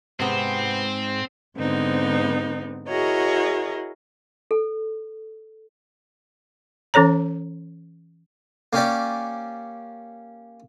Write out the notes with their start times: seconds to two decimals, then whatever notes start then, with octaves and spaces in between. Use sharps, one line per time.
0.20 G#2 C3 B3 C4 C5
1.56 G#2 D3 B3 C4 D#4
2.88 E4 F#4 G#4 A#4 C#5 D#5
4.51 A4
6.94 E3 C#4 A4 C#5 A#5
8.73 A#3 C#4 G4 D5